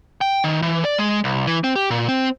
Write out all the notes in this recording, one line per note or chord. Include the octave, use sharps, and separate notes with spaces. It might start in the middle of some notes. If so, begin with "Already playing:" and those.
G5
D#3
E3
D5
G#3
C2
E3
C4
G4
A#2
C4